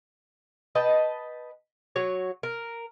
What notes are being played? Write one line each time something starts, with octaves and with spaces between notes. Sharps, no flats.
B4 D#5 G5 A5
F#3 F#4 C#5
A#4